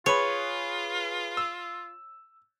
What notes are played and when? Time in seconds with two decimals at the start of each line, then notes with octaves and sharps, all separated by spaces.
0.06 F4 G#4 B4 C#5 B5
1.37 E6